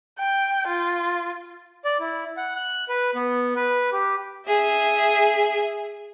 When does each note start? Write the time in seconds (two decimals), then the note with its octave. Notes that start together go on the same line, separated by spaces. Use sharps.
0.19 G5
0.68 F4
1.85 D5
2.00 E4
2.37 F#5
2.56 F#6
2.89 B4
3.15 B3
3.56 B4
3.92 G4
4.48 G#4 E5